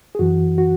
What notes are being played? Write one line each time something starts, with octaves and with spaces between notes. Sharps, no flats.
G#4
F#2 E3 F#4
F#4